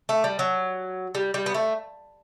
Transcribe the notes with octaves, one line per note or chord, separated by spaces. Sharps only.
A3
G3
F#3
G3
G3
B3
A3